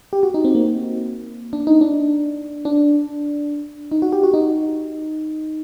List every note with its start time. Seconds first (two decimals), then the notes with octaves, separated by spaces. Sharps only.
0.13 G4
0.23 F#4
0.34 D#4
0.44 C4
0.55 A#3
1.53 D4
1.67 D#4
1.81 D4
2.65 D4
3.91 D#4
4.02 F#4
4.12 G4
4.23 F#4
4.34 D#4